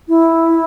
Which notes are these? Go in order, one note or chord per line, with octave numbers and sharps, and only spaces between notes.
E4